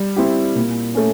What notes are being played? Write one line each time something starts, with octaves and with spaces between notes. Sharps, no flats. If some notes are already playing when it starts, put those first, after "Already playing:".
Already playing: G3
C4 E4 G4
A#2
A3 C#4